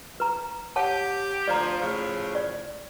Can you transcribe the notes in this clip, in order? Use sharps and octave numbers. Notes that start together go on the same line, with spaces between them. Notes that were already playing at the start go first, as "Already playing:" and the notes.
B4 A#5
G4 C#5 F#5 A5
D2 F3 D5 A#5
A2 C#3 F3
D5